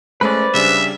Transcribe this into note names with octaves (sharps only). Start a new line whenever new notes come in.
G#3 A3 C#4 B4 C5 D5
C#3 G3 D4 E5